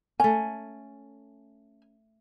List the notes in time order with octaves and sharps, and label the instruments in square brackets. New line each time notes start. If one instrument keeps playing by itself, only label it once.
[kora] A3 C#4 [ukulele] G#5